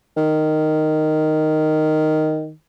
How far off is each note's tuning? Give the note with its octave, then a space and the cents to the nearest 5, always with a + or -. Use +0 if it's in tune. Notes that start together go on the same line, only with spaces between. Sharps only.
D#3 -5